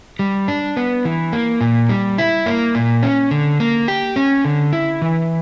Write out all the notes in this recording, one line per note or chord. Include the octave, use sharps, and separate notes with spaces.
G3
D4
B3
E3
A#3
A#2
G3
E4
A#3
A#2
C#4
D3
A#3
G4
C#4
D3
E4
E3